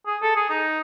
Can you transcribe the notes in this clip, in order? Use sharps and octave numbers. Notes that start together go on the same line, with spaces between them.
G#4
A4
G#4
D#4